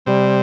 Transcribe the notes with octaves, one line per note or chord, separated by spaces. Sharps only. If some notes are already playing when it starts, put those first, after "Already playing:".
C3 G3